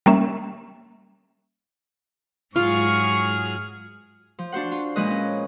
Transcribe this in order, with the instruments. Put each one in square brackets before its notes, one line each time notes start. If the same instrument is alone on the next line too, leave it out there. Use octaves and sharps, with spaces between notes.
[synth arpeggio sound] G3 A#3 C#4 E5
[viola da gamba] G#2 F#3 G#4 [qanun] F4 [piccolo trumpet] C#6 [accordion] F6
[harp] F3
D4 F#4 C5 F#5
F4
A#2 F3 G#3 B4 D#5 F#6
C#4